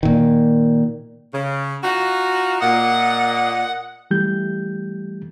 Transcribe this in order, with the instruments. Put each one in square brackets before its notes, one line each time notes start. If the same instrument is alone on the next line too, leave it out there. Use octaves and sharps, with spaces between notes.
[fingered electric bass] A#2 D#3
[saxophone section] C#3
D#4 F4 F#4
[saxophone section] A#2 D#5 [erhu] F#5
[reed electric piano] E3 G3 A3 G4 G6